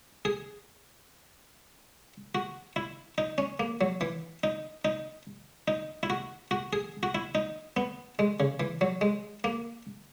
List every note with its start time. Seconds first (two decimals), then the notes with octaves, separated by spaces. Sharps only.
0.25 G#4
2.35 F#4
2.76 E4
3.18 D#4
3.38 C#4
3.60 A#3
3.81 F#3
4.01 E3
4.44 D#4
4.85 D#4
5.68 D#4
6.03 E4
6.10 F#4
6.51 F#4
6.73 G#4
7.03 F#4
7.15 E4
7.35 D#4
7.77 B3
8.19 G#3
8.40 C#3
8.60 E3
8.81 F#3
9.01 G#3
9.44 A#3